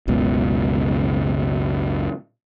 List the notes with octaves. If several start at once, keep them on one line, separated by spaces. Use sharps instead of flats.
F#1 C#2 B2